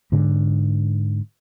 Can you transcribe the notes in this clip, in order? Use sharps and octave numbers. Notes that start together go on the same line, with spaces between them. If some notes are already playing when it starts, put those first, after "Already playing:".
G#2 D3 G#3